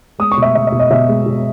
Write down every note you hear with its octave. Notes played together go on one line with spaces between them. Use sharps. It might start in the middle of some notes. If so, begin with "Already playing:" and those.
G#3 D#6
C#6
B2
E5
B2 E5
E5
B2
D#5
B2 E5
G#3
B2